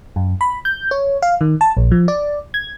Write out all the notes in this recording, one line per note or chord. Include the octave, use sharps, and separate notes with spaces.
F#2
B5
G6
C#5
F5
D#3
A5
A#1
F3
D5
G#6